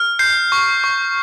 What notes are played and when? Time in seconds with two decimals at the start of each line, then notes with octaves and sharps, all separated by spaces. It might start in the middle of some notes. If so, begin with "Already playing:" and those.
Already playing: F6
0.19 G6 C7
0.52 C#6
0.84 C#6